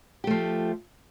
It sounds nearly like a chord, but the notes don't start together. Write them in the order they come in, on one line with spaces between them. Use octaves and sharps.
G4 A3 F3